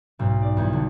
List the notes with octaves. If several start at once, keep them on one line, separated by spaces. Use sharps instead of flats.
B1 G#2
D5
E2 D#3 G3
D3